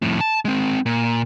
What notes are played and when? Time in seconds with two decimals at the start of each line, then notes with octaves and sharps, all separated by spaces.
0.02 F2 A2
0.20 A5
0.45 G#3 C4
0.86 A#2